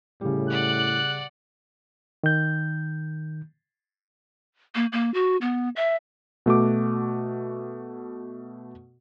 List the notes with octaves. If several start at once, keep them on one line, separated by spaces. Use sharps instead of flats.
A2 C#3 G3
D5 F#5 F#6
D#3 G6
A#3
A#3
F#4
B3
E5
B2 A3 F#4 D6